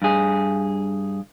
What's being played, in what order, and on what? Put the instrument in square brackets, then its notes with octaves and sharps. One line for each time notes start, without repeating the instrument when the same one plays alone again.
[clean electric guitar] G2 G#4